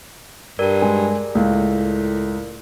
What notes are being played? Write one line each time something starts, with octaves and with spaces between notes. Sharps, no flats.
G2 A#4 D5
G#3
C#2 A2